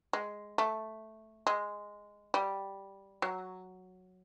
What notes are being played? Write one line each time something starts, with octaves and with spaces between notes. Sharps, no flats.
G#3
A3
G#3
G3
F#3